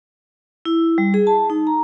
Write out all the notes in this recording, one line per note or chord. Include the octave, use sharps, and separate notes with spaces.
E4
G3
G#4
A5
D#4
A#5